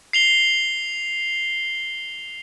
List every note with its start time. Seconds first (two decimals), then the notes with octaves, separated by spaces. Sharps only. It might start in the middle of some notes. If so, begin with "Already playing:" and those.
0.13 C7 F7 G7